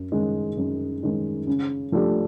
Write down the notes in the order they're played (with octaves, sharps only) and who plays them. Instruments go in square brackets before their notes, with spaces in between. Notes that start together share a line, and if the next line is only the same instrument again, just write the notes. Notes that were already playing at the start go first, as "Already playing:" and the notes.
Already playing: [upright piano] F#2
D#3 G#3 C#4
F#2
D#3 G#3 C#4
C#3
F3 A3 D4 G4